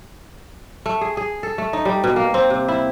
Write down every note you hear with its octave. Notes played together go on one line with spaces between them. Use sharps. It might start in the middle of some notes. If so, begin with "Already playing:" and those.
A3
G#4
G#4
A4
A3
D#4
G3
B2
A#3
C4
C3
E4